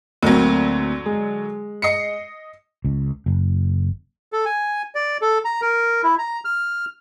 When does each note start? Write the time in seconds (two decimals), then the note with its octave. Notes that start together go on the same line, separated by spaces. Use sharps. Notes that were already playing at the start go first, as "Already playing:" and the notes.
0.23 D2 D3 F#3 A#3 C4
1.06 G#3
1.82 D#5 C7 C#7
2.84 C#2
3.26 F#1
4.33 A4
4.45 G#5
4.95 D5
5.21 A4
5.45 A#5
5.62 A#4
6.03 E4
6.19 A#5
6.45 F6